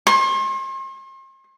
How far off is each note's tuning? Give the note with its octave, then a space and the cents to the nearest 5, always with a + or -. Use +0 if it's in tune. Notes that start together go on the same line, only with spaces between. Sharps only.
C6 +40